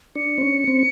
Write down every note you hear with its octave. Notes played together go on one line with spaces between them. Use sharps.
D4 C#7
C4
C#4
C4